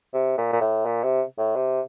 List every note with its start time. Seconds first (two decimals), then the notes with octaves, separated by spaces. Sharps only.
0.13 C3
0.38 A#2
0.53 A#2
0.61 A2
0.85 A#2
1.03 C3
1.38 A2
1.56 C3